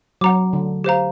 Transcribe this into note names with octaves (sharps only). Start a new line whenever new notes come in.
F#3 F#5 A#5 D6
D3
G4 C5 F5 A#5